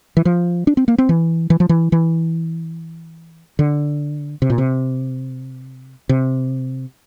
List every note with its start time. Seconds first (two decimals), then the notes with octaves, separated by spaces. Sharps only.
0.17 E3
0.25 F3
0.67 D4
0.77 C4
0.88 A#3
0.98 C4
1.09 E3
1.50 E3
1.60 F3
1.69 E3
1.92 E3
3.59 D3
4.42 C3
4.50 A#2
4.58 C3
6.09 C3